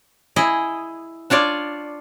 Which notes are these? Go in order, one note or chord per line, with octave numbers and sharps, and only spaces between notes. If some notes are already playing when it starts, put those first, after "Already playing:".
E4 G#4 D#5
D4 F4 C#5 D5